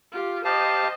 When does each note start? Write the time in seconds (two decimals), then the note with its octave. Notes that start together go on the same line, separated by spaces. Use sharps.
0.13 F4 G4
0.45 G4 C5 D#5 F5 A5